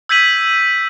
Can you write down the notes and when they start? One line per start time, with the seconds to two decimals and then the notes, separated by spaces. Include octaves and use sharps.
0.09 E6 G6 G#6 B6 D#7 F#7